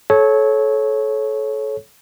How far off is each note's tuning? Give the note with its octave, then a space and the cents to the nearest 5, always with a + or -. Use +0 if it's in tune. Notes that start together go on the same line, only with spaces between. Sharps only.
A4 -30 C#5 -10